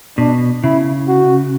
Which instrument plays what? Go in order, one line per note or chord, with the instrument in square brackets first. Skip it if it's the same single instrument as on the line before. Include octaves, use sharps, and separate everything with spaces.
[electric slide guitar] B2 [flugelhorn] D4
[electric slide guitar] C#3 [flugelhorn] E4
[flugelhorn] F#4